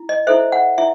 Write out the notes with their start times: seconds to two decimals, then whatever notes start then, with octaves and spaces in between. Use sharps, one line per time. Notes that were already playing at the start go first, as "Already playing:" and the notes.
Already playing: E4
0.09 D#5
0.27 E4 A4 C5 E5
0.52 F#5
0.78 E4 E5